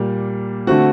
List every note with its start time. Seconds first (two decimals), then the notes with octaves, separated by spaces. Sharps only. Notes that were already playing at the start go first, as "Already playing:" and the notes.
Already playing: A#2 G3 A#3
0.67 D3 A3 C4 F#4